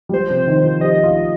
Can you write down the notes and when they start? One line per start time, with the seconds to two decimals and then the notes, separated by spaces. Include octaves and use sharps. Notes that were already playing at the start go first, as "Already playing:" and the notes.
0.09 G3
0.13 F3 C5
0.30 C3
0.47 D#3
0.64 F3
0.81 G4 D#5
1.04 F4